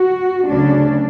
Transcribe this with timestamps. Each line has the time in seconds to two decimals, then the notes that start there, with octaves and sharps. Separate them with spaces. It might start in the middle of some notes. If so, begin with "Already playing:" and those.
Already playing: F#4
0.46 D2 C#3 F#3 C#4 D4